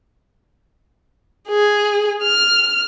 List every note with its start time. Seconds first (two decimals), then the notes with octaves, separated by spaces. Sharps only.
1.48 G#4
2.23 F6